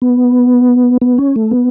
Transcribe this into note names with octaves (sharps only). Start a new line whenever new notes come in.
B3
B3
C#4
A3
B3